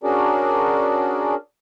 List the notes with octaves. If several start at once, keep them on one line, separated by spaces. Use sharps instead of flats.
C#4 D4 F#4 G#4 A#4 D5